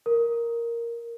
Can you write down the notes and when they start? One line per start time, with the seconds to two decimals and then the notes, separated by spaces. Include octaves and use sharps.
0.06 A#4